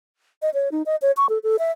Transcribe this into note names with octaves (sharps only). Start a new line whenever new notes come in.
D#5
C#5
D#4
D#5
C#5
C#6
A4
A4
E5